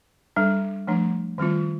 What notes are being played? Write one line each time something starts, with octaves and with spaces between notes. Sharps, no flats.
G3 D4 A4
F3 A3 D4
D#3 G3 C4 F4